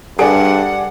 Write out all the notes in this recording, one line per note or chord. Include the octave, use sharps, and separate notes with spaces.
G2 D4 G#4 A4 F#5 G#5